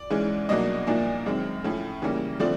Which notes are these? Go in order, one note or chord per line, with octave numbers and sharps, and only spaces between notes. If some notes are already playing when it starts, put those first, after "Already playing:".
Already playing: D5
G#2 E3 G#3 C#4
C2 B2 F#3 A#3 D4 D#5
C2 A#2 F3 A#3 D4
F#2 D#3 G#3 C4
A2 F3 A3 C#4
C#3 E3 G3 A#3 C#4
D3 F3 A3 C4 D5